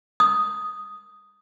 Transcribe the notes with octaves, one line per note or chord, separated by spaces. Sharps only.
D#6